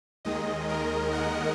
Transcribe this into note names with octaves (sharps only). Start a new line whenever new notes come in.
D#2 D#3 G#3 D#5
A#4
F#5